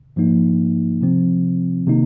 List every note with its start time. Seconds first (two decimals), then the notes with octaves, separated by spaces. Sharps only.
0.16 G#2 F3 A#3 D#4
1.02 C3 F3 C4
1.87 C3 D#3 A#3 D#4